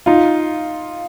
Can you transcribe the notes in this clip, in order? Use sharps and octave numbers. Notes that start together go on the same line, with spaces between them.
D#4 F4